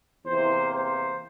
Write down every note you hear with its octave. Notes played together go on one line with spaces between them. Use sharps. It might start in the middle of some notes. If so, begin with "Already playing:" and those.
E2 C3 E3 A#3 C5
C5